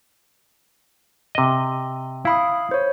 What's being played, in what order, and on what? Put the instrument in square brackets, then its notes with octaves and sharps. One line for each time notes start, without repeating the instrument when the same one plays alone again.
[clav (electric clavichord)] C3 D#5
[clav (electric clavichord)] E4 [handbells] F5 B5 D#6
[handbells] C5 C#5